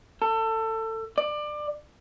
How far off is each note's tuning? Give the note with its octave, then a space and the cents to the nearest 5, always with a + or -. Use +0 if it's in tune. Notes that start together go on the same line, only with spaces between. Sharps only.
A4 +25
D5 +25